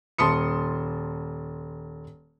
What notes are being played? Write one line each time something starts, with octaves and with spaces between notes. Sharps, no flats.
D#1 A5 C6 D#6 C#7